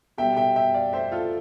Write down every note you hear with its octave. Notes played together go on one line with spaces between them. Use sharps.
B2 G3 E5 G5
E5 G5
E5 G5
D5 F5
C5 E5
F4 A4